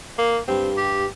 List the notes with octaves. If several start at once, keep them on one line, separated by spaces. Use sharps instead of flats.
A#3
G2 C4
G4